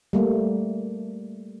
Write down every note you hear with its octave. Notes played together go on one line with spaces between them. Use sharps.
G3 A3 A#3